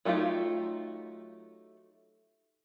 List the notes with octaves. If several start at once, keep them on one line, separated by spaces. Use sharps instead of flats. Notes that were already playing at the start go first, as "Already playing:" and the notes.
F#3 A3 D#4 F4 G4